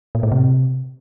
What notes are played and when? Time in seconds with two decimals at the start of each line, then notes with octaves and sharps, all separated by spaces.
0.15 A#2
0.23 A2
0.32 C3